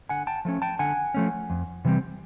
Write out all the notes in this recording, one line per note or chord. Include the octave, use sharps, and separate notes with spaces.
D3 F#5 G#5
G5 A5
F3 A3 C#4
G5 A5
D3 F#5 G#5
F3 A3 C#4
F2
C3 E3 G3 C4